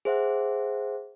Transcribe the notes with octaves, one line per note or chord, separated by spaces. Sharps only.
G#4 C5 E5 F#5